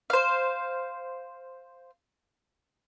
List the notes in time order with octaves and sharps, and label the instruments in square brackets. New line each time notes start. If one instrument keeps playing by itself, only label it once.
[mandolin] C5 F5